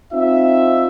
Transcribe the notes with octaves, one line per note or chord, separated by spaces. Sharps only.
C4 D#4 F4 E5